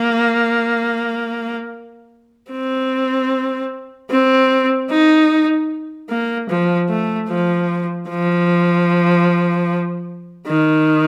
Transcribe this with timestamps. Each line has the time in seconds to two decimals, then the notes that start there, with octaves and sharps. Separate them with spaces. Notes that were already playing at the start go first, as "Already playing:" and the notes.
Already playing: A#3
2.51 C4
4.10 C4
4.90 D#4
6.10 A#3
6.49 F3
6.89 A3
7.29 F3
8.10 F3
10.48 D#3